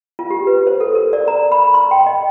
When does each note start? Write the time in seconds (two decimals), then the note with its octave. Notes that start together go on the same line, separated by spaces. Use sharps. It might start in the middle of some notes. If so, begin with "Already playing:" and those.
0.19 F4
0.30 G4
0.47 B4
0.67 C5
0.80 A4
0.95 A#4
1.13 D5
1.28 A#5
1.52 B5
1.74 C6
1.91 G5
2.07 D#5